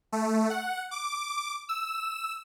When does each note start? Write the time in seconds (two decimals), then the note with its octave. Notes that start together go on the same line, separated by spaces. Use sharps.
0.12 A3
0.50 F#5
0.91 D6
1.69 E6